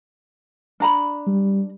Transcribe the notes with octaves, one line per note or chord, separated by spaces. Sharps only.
D4 A#5 B5
G3